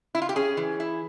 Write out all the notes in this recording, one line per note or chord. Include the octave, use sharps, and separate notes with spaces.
E4
F4
G4
C#4 G#4
E3
E4